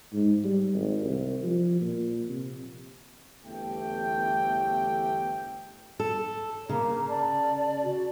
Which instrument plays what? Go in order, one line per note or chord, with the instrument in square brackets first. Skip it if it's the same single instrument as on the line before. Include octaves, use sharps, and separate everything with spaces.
[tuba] G#2
G3
G#1
C2
F3
A#2
C3
[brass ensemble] G1 E2 E3 A3 G4 G5
[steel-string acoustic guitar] A4
[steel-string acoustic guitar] C#3 [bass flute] A#3 [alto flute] A#5
[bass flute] D5 [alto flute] A5
[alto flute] F#4